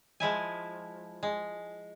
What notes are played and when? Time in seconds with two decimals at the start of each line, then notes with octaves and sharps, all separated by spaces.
0.20 F3 G#3 E4 G#5
1.23 G#3